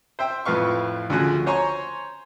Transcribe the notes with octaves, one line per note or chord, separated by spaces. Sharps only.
C5 E5 G5
F2 A2 B4 F5 C#6
D2 C#3 F3 F#4 G#5
C5 C#5 G#5 A#5 C6 C#6